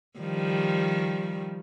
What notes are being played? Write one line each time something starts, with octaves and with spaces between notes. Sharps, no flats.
D#3 F3 G3